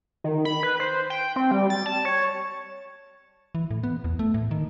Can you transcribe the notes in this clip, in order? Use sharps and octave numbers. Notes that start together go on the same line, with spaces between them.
D#3
B5
B4
C5
G5
C4
G3
A6
A5
C#5
E3
A2
B3
E2
A3
A2
D#3